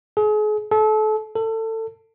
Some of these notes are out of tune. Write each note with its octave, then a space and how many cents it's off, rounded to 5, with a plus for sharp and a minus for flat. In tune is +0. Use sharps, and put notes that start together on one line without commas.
G#4 +40
A4 -30
A4 +25